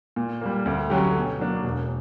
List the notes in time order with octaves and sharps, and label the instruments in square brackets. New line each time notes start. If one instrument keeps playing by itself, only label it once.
[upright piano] A#2
G3 A#3
D2
D3 F#3 C#4 G4
B2
F#3 A#3 D4
E1